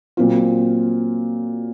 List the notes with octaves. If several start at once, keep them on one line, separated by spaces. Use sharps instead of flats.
A#2 F#3 C4 F4